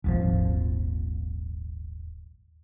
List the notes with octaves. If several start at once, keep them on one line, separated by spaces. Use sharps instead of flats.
D#1 G#1 F3